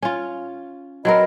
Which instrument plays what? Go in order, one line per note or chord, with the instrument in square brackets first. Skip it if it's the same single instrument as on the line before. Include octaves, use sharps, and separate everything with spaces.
[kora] C#4 F4
[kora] F#3 C4 A#4 [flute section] B4 D#5 B5